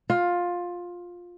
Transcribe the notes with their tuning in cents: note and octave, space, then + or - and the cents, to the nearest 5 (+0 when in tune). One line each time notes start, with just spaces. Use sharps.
F4 +15